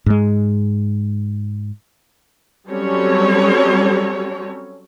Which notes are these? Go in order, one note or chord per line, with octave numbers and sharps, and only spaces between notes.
G#2 G#3
F#3 G3 C4 C#4 A4 C#5